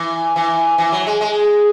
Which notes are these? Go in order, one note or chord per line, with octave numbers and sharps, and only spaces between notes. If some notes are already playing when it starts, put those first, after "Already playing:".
Already playing: E3
E3
E3
F#3
G#3
G#3